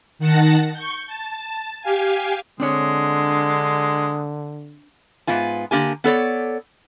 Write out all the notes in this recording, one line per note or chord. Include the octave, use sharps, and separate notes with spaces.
D#3 F#5 A5 A#6
C#6 G6
A5
G4 F5 G#5
D3 G#3 C4 D4 C#5
G#2 B3 F4 G#5
D3 A#3 G4 G#5
B3 A4 C#5 D5